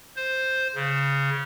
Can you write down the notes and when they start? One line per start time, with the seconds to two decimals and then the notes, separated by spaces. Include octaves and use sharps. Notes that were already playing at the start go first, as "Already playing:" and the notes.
0.16 C5
0.75 C#3